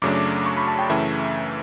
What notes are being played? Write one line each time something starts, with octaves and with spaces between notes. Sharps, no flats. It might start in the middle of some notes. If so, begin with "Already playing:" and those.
F#2 C#3 F#3 A3 D4 D6
C#6
B5
A5
G5
F#2 C#3 E3 A3 E5